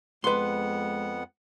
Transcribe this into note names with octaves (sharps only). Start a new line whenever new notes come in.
F2 G#3 B3 B4 F#5 C6